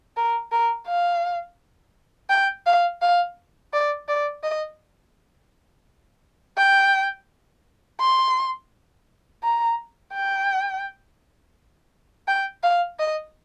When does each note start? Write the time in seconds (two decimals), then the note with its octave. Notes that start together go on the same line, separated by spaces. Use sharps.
0.17 A#4
0.52 A#4
0.87 F5
2.30 G5
2.66 F5
3.02 F5
3.73 D5
4.08 D5
4.44 D#5
6.57 G5
8.00 C6
9.43 A#5
10.14 G5
12.28 G5
12.63 F5
12.99 D#5